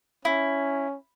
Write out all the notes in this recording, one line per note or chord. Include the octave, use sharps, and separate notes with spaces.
C#4 E4